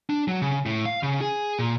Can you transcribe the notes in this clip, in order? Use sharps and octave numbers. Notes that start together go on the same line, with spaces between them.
D4
F#3
C#3
A2
F5
C#3
G#4
A#2